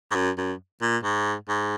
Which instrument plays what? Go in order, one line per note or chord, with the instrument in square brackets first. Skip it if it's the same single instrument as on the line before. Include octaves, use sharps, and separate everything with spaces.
[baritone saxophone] G#2
F#2
F#2
A#2
G#2
G#2